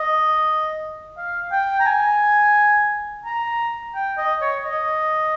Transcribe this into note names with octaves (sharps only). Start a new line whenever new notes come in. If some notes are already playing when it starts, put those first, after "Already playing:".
Already playing: D#5
F5
G5
A#5
G#5
A#5
G5
D#5
C#5
D#5